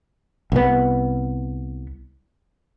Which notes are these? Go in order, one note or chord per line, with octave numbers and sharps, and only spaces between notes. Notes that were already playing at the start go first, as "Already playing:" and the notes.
C2 B3